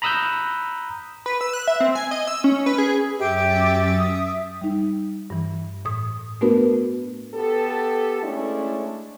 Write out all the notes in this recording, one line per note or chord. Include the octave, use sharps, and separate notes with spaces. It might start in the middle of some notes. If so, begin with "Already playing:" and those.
A#5 B5 D#6 E6 F#6 G6
B4
E6
F#6
E5
C4
G#5
D#5
E6
C#4
B4
G#4
F#2 C#4 G4 E5 G5 D6 A6
D#6
G3 D#4
G2 E3
A2 D#6
A3 B3 D4 F#4 A#4 B4
B3 G4 A4
G#3 A3 C#4 D4 E4